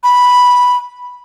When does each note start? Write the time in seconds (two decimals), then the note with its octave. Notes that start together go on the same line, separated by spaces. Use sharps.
0.03 B5